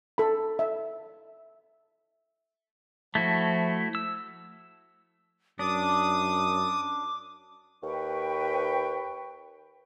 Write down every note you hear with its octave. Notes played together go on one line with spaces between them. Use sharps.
A4 B5
E5
F3 A3 E4 F#4
E6
F#2 D4 D6 D#6
D#2 B4 G5 C#6